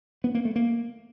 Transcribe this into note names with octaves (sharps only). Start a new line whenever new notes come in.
B3
A#3
A3
A#3